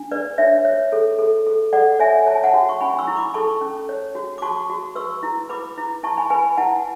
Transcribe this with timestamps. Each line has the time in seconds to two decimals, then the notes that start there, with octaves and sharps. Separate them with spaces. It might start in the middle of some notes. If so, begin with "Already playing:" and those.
Already playing: D4
0.11 B4 D5
0.38 D4 C#5 E5
0.65 C#5
0.92 A4
1.19 A4
1.47 A4
1.73 A4 D5 F#5
1.99 C#5 E5 G#5
2.27 C#5 A5
2.34 G#5
2.43 F#5 A5
2.54 F#4
2.69 C#6
2.81 C#4 G#5 B5
2.99 C#6 E6
3.07 E4
3.16 B5 D6
3.34 A4 A5 C#6
3.61 C#4
3.89 C#5
4.15 F#4
4.38 D6
4.42 F#4 A5 C#6
4.70 F#4
4.96 B4 C#6 E6
5.23 E4
5.49 B4 B5 D6
5.77 E4
6.03 E4 A5 C#6
6.17 G#5 B5
6.30 B4 G#5 B5
6.57 E4 F#5 A5